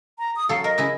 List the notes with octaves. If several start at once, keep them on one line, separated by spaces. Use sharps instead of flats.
A#5
D#6
F#3 A4 F5
A#4 D#5
C#3 E4 G#4